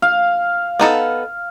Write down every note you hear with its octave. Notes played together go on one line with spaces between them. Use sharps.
F5
B3 D#4 A4